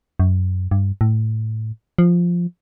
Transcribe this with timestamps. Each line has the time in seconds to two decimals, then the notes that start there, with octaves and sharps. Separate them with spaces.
0.20 F#2
0.71 G2
1.01 A2
1.98 F3